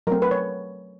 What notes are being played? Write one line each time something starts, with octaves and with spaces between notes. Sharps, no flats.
F#3 A3 C4 A#4
B4
C#5